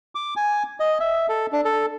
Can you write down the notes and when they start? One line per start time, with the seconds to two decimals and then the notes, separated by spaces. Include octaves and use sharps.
0.15 D6
0.36 G#5
0.80 D#5
1.00 E5
1.29 A4
1.52 D4
1.65 A4